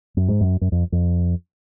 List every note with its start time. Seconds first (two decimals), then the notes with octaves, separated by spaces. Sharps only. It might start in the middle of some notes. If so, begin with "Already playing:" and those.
0.17 F#2
0.28 G#2
0.41 F#2
0.61 F#2
0.72 F2
0.92 F2